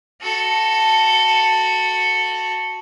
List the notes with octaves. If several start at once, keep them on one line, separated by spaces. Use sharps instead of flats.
F#4 A4